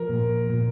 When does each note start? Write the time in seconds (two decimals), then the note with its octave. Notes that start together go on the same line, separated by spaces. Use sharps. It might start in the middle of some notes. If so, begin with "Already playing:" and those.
Already playing: F3 A#4
0.09 A#2
0.50 A#2